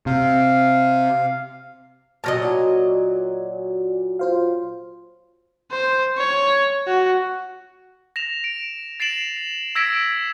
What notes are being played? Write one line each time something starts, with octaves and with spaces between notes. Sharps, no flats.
C3 F5
A#2 F#3 D#5 A5 F6 A#6
F#4 D5
F4 C5 F5
C5
C#5
F#4
A#6 E7 F7
D7
A6 C7 D7 E7 F#7
E6 G#6 A#6 B6 D7 E7